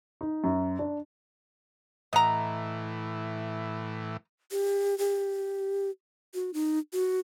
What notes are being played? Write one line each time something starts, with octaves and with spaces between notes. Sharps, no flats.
D#4
F#2
D4
A2 E3 D#5 F#5 A#5
G4
G4
F#4
D#4
F#4